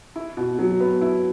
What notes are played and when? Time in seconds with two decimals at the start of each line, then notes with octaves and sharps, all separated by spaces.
0.16 E4
0.37 B2
0.59 F#3
0.80 B3
1.01 E4